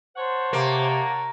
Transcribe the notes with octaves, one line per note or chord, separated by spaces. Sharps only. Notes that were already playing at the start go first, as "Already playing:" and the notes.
C5 C#5 F#5 A5
C3 A#3